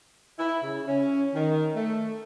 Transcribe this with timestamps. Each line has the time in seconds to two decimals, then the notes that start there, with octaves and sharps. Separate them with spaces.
0.39 E4
0.62 C#3
0.87 C#4
1.34 D#3
1.75 A3